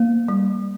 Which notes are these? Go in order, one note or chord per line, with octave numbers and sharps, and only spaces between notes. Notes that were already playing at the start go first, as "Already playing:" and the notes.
Already playing: A#3
G3